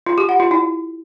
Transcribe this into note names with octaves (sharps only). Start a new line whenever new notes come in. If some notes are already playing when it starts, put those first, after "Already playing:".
F4
G4
F#5
F4
E4